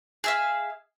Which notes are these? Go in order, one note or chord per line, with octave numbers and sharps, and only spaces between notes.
G#4 E5 F5